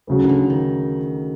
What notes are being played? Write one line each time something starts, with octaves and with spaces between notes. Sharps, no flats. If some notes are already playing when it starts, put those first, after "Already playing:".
D2 C#3 F#3
D#3
D3
D#3